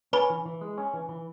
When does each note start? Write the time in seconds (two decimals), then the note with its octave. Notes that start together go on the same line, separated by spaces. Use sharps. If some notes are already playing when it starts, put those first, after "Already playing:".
0.13 C#4 B4 B5
0.30 E3
0.46 E3
0.61 G#3
0.78 C#4
0.94 E3
1.09 E3